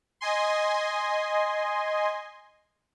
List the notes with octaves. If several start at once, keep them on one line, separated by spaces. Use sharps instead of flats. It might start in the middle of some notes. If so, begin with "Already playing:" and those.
D#5 G#5 C6